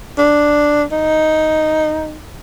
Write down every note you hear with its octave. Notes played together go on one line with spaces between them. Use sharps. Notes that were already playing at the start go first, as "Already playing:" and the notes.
D4
D#4